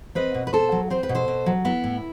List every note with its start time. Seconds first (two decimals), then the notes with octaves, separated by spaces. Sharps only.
0.15 C4 B4 D#5
0.35 B2
0.47 B4
0.53 B2 A4 C5
0.72 F#3
0.90 C4 C5
1.03 B4
1.09 B2
1.15 A4 C5
1.28 B2
1.46 F#3
1.65 B3 E4
1.84 A2